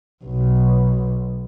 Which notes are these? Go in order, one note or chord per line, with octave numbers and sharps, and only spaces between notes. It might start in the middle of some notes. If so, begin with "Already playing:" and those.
B1